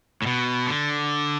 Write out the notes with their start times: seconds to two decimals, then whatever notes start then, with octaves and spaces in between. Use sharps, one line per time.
0.22 A2
0.26 B2
0.67 D3